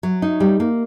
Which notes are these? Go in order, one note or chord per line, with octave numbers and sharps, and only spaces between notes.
F#3
D#4
G3
A#3